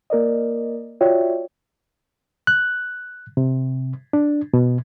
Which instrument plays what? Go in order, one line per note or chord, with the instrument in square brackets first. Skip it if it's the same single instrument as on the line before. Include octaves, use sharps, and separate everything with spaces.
[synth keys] A#3 A#4 D5 D#5
F4 F#4 C#5 D5 E5 G5
[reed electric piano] F#6
C3
D4
B2